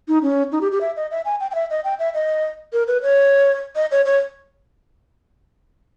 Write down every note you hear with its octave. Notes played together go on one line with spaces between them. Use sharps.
D#4
C#4
D#4
G4
G4
E5
D#5
E5
G#5
G5
G5
E5
D#5
G5
E5
D#5
A#4
B4
C#5
D#5
C#5
C#5